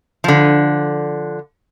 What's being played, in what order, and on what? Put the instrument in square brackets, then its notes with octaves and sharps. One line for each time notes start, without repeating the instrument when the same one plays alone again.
[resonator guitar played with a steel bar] D3 F3